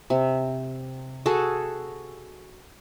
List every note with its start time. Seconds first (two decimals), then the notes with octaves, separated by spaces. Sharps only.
0.10 C3
1.26 F#4 G#4 A4